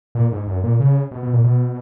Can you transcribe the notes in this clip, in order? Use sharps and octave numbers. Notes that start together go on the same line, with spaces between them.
A#2
G#2
F#2
A#2
C#3
B2
B2
A#2
B2